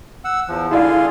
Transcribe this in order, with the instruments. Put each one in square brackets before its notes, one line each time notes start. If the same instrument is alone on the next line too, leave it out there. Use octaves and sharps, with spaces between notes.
[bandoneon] F#5 E6
E2 F3
[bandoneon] D3 F4 G#4 [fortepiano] E4 D5 F5